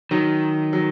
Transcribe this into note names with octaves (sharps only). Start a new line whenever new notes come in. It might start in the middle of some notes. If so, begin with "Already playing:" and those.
D#3 F#3
F#3